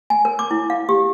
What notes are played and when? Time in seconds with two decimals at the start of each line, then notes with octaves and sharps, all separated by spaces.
0.10 G#5
0.25 A#4
0.39 D6
0.51 E4
0.70 F5
0.89 G4